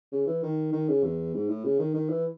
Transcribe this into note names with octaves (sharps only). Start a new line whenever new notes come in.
C#3
E3
D#3
D#3
C#3
E2
G#2
A2
C#3
D#3
D#3
E3